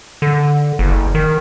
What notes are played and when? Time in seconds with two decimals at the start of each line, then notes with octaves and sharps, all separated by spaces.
0.22 D3
0.79 F#1
1.15 D#3